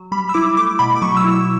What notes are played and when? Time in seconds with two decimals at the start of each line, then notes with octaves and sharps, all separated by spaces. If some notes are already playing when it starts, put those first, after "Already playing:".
Already playing: F#3
0.12 G3 B5
0.29 E6
0.34 E4 D6
0.57 A3 D6
0.79 B2 B5
0.96 D6
1.02 F#3 C#6
1.17 E6
1.24 E4
1.32 E6